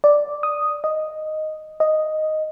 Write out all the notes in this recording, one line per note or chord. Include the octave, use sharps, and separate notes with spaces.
D5
D#6
D#5
D#5